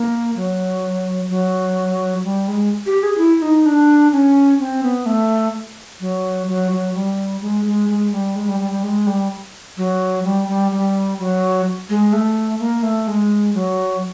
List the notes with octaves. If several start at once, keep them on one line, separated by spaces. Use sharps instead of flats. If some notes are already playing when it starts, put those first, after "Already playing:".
Already playing: A#3
F#3
F#3
G3
G#3
G4
G#4
E4
D#4
D4
C#4
C4
B3
A3
F#3
F#3
F#3
G3
G#3
G#3
G#3
G3
G#3
G3
G3
G3
G#3
G3
F#3
G3
G3
G3
F#3
G#3
A3
A#3
A3
G#3
F#3